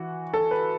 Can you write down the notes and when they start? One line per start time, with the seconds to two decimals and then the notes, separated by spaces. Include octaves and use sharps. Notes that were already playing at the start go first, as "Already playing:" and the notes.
Already playing: E3 F#4
0.34 A4
0.51 B4